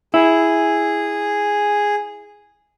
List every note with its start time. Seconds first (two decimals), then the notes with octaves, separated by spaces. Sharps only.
0.14 E4 G#4